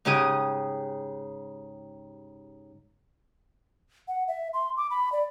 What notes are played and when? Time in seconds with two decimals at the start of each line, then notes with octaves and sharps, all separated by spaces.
0.05 G#2 C#3 G4 G#4 D#6
4.08 F#5
4.28 E5
4.53 C6
4.77 D6
4.90 B5
5.12 D5